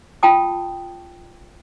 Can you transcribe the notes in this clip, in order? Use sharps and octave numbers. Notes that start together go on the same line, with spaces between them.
F4 G5 A5 D#6